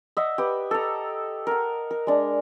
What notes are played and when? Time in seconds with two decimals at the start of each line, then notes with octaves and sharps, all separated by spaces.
0.17 D#5 E5 F#5
0.38 G4 B4
0.71 A4 A#5
1.47 A#4 F#5
1.91 A#4
2.07 G#3 D4